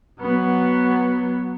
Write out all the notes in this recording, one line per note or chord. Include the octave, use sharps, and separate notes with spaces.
F#3 B3